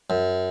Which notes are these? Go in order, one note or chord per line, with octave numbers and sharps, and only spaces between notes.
F#2